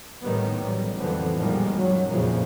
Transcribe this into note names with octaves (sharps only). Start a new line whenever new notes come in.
A2 D#3 G3 B3
A1 F#3 G3
F2 D3 E3 B3 C4
A#2 D#3 F3 G3 G#3
F#2 F#3
F2 A#2 C#3 E3 F3